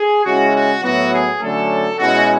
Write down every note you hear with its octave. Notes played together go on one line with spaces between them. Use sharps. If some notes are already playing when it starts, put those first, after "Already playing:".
Already playing: G#4
C#3 G#3 C#4 E4 F#4
F#4
A2 F#3 B3 E4 F#4
G#4
D3 F#3 A3 C#4 A4
B2 G#3 C#4 E4 F#4